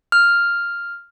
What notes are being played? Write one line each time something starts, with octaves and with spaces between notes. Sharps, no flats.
F6